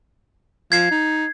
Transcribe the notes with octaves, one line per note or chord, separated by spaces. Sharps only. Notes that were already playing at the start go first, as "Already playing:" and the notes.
F3 G#6 C7
D#4